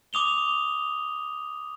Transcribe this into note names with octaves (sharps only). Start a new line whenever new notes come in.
D6 D#6 F7 G7